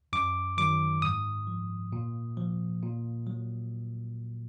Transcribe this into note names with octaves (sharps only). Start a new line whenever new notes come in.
F#2 D6
D#3 F#3 D6
G#2 D#6
F3
A#2
F3
A#2
F#3